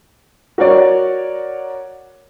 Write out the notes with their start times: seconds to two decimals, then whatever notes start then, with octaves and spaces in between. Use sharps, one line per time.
0.58 F#4 A#4 C#5 D5